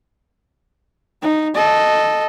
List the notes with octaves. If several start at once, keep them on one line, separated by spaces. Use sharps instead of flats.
D#4
A4 D#5